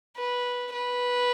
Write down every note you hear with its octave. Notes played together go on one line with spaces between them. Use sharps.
B4
B4